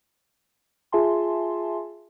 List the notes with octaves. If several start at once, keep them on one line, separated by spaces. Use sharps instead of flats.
F4 G#4 E5 G#5 A5 C6